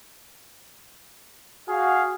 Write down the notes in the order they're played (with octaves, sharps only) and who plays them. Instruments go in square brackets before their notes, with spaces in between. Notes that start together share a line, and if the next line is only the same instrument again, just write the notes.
[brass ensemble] F#4 F5 [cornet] G#4